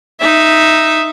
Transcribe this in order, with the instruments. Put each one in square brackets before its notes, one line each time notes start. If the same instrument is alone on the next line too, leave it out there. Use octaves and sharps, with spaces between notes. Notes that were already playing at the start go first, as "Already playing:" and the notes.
[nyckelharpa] D#4 E5